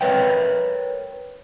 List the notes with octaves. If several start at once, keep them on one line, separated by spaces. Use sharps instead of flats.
A#4 B4 C#5 E5 G5